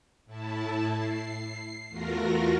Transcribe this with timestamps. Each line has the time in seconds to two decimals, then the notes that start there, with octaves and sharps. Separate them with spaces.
0.26 A2 E4 A5
0.92 C7
1.89 E2 A3 F4 F#4 A#4 A#6